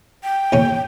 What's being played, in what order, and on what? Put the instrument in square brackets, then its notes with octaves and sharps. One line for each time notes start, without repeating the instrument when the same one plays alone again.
[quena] G5
[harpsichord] D#2 C#4